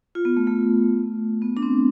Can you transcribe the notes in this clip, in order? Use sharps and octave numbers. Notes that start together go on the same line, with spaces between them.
F4
B3
A3
A3
B3
D4
C4